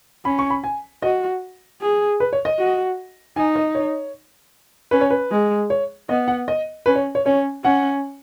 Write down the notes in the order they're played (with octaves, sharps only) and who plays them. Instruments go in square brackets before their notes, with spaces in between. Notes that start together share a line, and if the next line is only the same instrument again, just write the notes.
[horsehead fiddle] C#4 [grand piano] B5
[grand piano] C#6
B5
G#5
[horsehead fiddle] F#4 [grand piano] D#5
[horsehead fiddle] G#4
[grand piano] B4
C#5
D#5
[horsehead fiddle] F#4
[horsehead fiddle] D#4 [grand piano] G#5
[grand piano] D#5
C#5
[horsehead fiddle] C#4 [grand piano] B4
[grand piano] C#5
B4
[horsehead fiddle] G#3
[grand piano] C#5
[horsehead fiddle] B3 [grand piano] D#5
[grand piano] F#5
D#5
[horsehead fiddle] C#4 [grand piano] B4
[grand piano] C#5
C#5
[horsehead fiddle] C#4 [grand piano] C#5
[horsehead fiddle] C#4 [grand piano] F#5